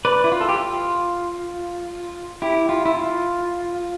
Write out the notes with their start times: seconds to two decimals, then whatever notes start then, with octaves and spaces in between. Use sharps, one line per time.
0.05 B4 D5
0.24 E4
0.32 F4
0.41 A4
0.49 G4
0.58 F4
2.42 E4 G4
2.69 F4
2.86 E4
2.95 F4